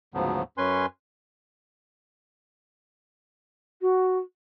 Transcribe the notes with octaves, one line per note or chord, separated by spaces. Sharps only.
D2 G#2 C#3 F3 F#3 B3
F#2 C#4 B4 G#5 C6
F#4